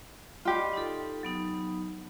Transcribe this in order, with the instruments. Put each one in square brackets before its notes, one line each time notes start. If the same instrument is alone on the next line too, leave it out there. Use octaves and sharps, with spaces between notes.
[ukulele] F4 G4 [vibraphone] D5 D#5 B5
[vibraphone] D#4 A4
F#3 B3 D#4